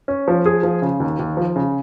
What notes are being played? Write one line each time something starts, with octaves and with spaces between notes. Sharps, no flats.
C#4
F3
G#4
F3
C#3
D#2
D#2
F3
C#3